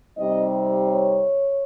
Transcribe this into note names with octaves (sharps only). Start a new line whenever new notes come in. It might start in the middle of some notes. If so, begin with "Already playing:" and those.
C3 G3 C4 D#4 D#5
C#5